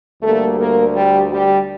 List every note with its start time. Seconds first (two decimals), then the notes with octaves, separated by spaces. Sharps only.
0.22 D2 D3 G3 A3 A#3 A4
0.59 A#3 A#4
0.96 G3 G4
1.33 G3 G4